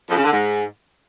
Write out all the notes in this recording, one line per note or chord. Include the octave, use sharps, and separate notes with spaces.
F2
C#3
D3
G#2